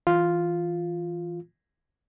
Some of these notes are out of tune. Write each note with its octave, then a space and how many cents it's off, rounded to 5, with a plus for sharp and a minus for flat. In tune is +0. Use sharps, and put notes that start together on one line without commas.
E3 -5 F4 +0